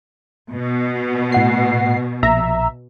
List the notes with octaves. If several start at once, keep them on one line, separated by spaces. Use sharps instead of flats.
B2
A2 F#5 C7
A#1 E5 A#5